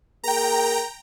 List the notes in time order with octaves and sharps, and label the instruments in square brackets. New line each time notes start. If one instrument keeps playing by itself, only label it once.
[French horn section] A#3 G#4 A#4 [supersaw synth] G5 A#5